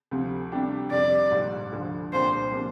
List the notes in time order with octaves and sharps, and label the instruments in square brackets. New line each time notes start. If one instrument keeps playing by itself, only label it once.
[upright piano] D2 C3 F3
C3 G3 D4 G4
[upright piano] F2 C3 G3 [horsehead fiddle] D5
[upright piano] A#1 G#2 G3
D2 D3 F3
[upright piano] C2 A#2 G3 D4 G4 [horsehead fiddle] C5
[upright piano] C3 F3 A#3 D4